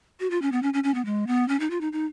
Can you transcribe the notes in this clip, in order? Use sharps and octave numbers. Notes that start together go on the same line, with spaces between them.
F#4
F4
C#4
B3
C#4
C#4
C#4
B3
G#3
B3
C#4
D#4
F4
D#4
D#4